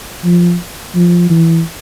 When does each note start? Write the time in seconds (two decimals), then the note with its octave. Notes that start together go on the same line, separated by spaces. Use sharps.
0.24 F3
0.95 F3
1.30 E3